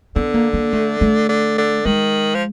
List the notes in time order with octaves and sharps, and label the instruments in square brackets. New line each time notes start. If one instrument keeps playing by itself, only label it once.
[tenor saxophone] D3 [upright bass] B3
[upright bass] A#3
A#3
A3
A3
[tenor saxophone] D3
D3
[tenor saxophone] D#3 [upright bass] G#3
[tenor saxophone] F3